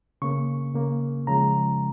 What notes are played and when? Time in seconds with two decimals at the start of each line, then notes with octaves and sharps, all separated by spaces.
0.22 C#3 A#3 C#6
0.75 C#3 A#3
1.27 C#3 F3 G#3 A#5